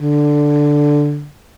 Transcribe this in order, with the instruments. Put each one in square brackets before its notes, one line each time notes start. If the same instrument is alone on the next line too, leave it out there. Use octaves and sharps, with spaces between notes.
[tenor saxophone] D3